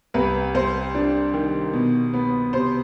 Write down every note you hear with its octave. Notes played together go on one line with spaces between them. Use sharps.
C2 B4
C2 C5
D4
D#3
B2
B3
C3 C5